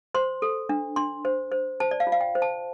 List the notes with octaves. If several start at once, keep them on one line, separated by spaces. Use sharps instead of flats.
C5 C6
A4
D4
D4 C6
C5
C5
C5 A5
D5
F5
F4
F5
G5
C5
A5